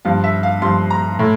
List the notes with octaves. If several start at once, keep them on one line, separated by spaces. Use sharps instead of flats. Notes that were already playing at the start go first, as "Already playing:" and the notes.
G2 F3 F5
E5
F5
G2 F3 C6
A#5
A2